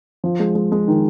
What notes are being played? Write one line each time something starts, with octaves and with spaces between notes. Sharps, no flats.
F3
G#3
G#3
G#3
D#3